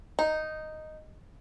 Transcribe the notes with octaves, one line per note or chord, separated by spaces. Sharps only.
D#4